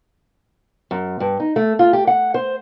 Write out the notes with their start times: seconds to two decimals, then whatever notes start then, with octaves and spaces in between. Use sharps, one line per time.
0.91 F#2
1.20 G2
1.40 D#4
1.56 A3
1.79 F4
1.93 G4
2.07 F#5
2.34 C5